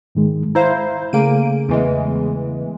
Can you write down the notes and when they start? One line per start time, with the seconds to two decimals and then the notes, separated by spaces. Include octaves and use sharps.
0.15 G#2 D#3 G#3
0.55 E4 C5 F5 A#5
1.13 C#3 A3 A#3 G#4 D7 D#7
1.69 E2 E3 G#3